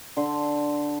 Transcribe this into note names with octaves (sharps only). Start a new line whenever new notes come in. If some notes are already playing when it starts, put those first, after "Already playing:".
D3 C6